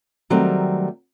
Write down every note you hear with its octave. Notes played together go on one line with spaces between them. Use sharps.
D#3 F#3 G3 A3 C4 A#5